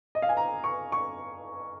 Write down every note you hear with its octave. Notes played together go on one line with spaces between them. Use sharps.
D#5
F5
G#5
A#5
C#6
C#6